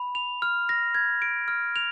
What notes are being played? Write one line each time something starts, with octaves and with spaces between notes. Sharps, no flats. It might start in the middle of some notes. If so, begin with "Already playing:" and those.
Already playing: B5
F7
F6
A#6
G#6
D7
F6
F7